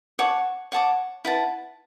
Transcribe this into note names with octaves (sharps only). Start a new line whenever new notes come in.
C#5 F#5 A5 D6
C#5 F#5 A5 D6
E4 B4 F#5 A5